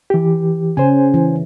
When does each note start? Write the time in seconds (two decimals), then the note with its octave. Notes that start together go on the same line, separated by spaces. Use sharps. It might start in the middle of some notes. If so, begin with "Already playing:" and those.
0.10 E3 G4
0.77 C#3 C#4 C5 G#5
1.14 E3